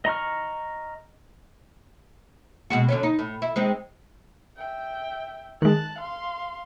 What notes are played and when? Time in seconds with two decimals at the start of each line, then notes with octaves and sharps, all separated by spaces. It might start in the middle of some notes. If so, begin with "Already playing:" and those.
0.05 D#5 A#5 C#6 F6
2.70 B2 G#3 F#4
2.89 D3 F#3 C#4
3.03 D#4
3.19 A2
3.42 E4
3.56 G#3 C4 D#4
4.57 E5 G5
5.62 D#3 G#3 A5 F#6
5.98 F5 C6